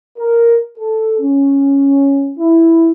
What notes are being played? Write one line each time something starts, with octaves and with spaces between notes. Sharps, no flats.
A#4
A4
C#4
E4